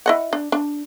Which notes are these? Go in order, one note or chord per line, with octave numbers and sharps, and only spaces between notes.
E4 D#5 F#5
D4
D4